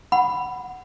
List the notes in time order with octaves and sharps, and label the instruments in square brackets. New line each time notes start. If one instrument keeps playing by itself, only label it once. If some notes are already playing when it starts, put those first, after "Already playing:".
[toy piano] F#5 B5